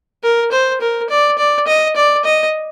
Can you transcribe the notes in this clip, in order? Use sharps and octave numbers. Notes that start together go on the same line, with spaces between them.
A#4
C5
A#4
D5
D5
D#5
D5
D#5